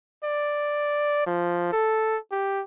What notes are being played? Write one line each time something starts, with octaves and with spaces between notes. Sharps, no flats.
D5
F3
A4
G4